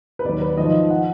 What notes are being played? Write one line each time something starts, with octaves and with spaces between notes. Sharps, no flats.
B4
D#2 D#3 F#3 D5
B4
G#2 F3 D#5
F3 F#5